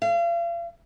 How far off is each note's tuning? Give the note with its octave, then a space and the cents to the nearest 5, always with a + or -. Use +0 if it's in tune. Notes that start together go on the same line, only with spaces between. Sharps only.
F5 -40